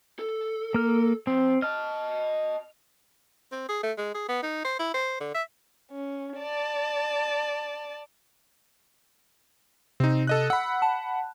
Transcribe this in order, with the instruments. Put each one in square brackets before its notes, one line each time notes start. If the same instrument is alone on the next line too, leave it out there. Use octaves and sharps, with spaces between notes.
[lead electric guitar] A4
[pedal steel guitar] A#3 F6
[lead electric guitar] F3 [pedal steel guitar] C4
[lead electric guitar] D#5 A5 [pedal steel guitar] F6
[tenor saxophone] C4
G#4
A3
G#3
G#4
B3
D#4
C5
E4
C5
D3
E5
[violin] C#4
D5 A5
[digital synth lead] C3 [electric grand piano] C4 D#4
[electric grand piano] A4 D#5 F#6
[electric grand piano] F#5 B5 [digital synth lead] E6
[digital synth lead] A5